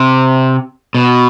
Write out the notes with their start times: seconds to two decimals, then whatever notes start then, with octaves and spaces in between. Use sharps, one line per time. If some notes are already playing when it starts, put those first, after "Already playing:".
Already playing: C3
0.95 B2